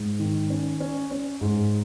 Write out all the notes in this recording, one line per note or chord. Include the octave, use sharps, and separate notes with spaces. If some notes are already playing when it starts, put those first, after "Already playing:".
Already playing: G#2
D#3
C#4
C#4
C#4
G#2